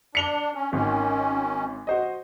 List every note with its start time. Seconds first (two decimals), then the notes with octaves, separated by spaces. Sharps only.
0.15 D4 C#7 F7 G7
0.55 C#4
0.73 G#1 D#3 C#4
1.87 F#4 C5 D#5